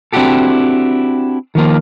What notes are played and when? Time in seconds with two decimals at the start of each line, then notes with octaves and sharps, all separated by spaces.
0.13 C4 D4 E4 F#4 G4 A4
1.55 D#3 F3 A#3 F4